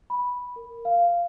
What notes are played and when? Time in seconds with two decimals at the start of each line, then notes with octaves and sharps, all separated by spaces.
0.10 B5
0.56 A#4
0.85 F5